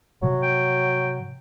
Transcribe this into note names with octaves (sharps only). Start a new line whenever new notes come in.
G#2 C3 F3 F#3
G5